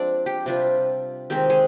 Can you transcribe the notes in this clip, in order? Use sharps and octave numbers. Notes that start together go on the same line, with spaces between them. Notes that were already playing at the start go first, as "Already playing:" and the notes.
Already playing: F3 G#3 C4 D4 D5
G4
C3 G3 D4 F4
D#3 G#3 C4 G4
G#3 G#4